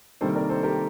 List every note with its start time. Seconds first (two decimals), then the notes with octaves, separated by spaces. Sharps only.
0.21 C3 D#3 G3 A#3 A4 C5
0.35 A#4 D5
0.49 A4 C5
0.63 G4 A#4